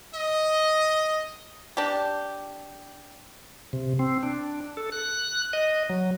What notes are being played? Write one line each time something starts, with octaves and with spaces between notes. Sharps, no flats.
D#5
D4 G4
C3
C4
D4
A4
F#6
D#5
F#3